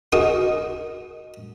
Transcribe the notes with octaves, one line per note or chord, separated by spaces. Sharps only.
D#4 F#4 G#4 A#4